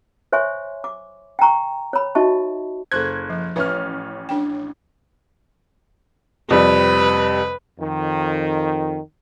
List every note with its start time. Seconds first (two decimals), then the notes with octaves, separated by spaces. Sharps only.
0.32 C5 C#5 E5 G#5 C6 C#6
0.84 D6
1.39 G5 G#5 A#5 C#6
1.93 C#5 B5
2.15 D#4 F#4 D#5 E5 A5 C#6
2.92 F#1 A4 C5 F#6 G#6
3.30 F3
3.56 A1 C#4 B4 C#5 E5 F6
4.29 D4 G5
6.51 F2 C3 G3 B4
7.79 F2 D#3